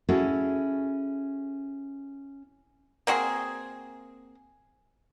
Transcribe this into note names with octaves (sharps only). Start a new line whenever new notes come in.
C#4 E4 F#4 G#4 A4
A#3 C4 F#4 G#4